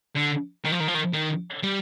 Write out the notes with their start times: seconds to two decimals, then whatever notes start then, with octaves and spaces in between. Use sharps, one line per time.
0.16 D3
0.65 D#3
0.72 F3
0.80 D#3
0.88 F3
0.95 D#3
1.13 D#3
1.63 G3